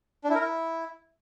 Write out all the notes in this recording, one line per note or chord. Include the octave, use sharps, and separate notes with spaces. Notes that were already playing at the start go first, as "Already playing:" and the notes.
D4
E4
A#4
E4